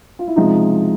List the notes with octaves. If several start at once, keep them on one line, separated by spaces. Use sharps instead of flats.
F4
E4
C#2 C3 F3 G#3 D#4